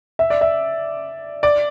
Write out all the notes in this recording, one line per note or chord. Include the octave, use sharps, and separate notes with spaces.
E5
D5
E5
D5